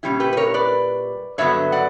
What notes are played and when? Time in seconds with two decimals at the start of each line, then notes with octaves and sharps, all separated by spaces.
0.03 A#2 G3 C#4 E4 G4
0.20 G4 B4
0.33 B4
0.37 A#4 C#5
0.54 B4 D5
1.38 G2 D3 F#3 B3 C#5 E5
1.72 D5 F#5